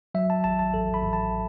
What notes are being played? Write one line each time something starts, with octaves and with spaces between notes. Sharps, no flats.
F#3 E5
A5
A1 A5
A5
A1 A4
B5
A1
A5